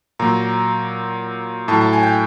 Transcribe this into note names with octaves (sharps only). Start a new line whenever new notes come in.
A#2 F#3 A#5
A2 F#3 A5
A5
G#5
G5